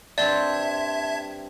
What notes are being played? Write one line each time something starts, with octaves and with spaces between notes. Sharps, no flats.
G2 C4 C5 D5 E5 A5 G#6